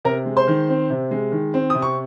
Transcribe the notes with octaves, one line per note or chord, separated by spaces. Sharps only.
C3 A#4 A#5
G#3
C5 C6
D#3
C4
C3
G#3
D#3
C4
C3 D#6
C#6